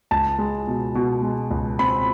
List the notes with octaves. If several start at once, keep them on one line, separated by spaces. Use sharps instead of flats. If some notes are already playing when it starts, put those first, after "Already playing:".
C#2 A5
G#3
B2
B2
G#3
C#2
C4 B5